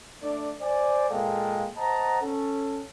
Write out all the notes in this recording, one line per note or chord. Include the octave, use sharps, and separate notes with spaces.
A3 D4 D5
C5 D5 G#5
A#2 G#3 A#3 A4 F5 G5
C5 D#5 F#5 A5 A#5
C#4 A4